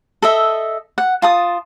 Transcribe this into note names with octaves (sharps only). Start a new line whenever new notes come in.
A4 D#5 E5
F#5
F4 A5 D#6